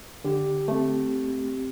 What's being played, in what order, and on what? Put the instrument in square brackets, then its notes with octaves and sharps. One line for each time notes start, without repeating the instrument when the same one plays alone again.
[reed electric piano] D3 [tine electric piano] G4
[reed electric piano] A3 [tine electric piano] C4